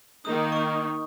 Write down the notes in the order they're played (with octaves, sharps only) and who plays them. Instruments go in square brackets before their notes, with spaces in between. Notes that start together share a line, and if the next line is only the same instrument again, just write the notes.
[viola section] D#3 A#3 D#4 [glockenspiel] D#6
[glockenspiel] C#6
D#6